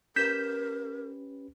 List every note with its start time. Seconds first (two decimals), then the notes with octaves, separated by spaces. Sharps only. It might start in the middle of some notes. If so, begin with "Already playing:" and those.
0.16 C#4 G4 A#4 B4 G6 B6 E7